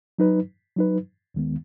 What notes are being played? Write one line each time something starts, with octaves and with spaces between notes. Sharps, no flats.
F#3 D#4 B4
F#3 D#4 B4
D#2 D#3 G#3 B3